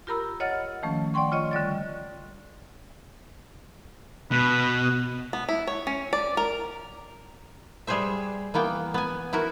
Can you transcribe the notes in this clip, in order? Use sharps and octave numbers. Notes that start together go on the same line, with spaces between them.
F4 G4 A#4 A#5 B5 E6
C#5 D#5 F#5 F6 A6
D#3 F3 A3 C#4
D5 F#5 G5 C6 C#6
F4 C#5 D#5 C#6
D3 G3 D5 A6
B2 B4
B3
E4
C#5
C#4
D5
A#4
G3 G#4 B4 C5 E5
E3 A#3 B3 G5
B3 G#5
E4 F#4 A#4